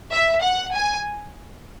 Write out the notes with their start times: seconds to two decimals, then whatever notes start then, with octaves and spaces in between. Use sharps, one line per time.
0.12 E5
0.43 F#5
0.74 G#5